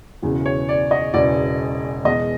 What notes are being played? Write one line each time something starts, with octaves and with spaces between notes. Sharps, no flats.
E1 E2 C#3 E3
C#5
D5
D#5
E1 E2 C#3 E3 D5
E2 B2 G#3 D#5